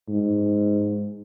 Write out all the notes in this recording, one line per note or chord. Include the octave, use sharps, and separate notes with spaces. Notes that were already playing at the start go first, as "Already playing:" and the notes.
G#2